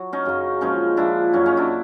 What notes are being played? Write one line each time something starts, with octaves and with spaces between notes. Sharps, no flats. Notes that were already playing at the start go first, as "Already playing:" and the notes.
Already playing: F#3
C#4 D#4
F#2 C#3 F#3
A#2 F3 G#3 C#4 D#4
A#2 F3 G#3 D4 E4
F#2 C#3 F#3 C#4 D#4
C#4 D#4
D4 E4